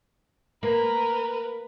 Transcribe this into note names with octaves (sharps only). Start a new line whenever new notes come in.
A#3 A#4 B4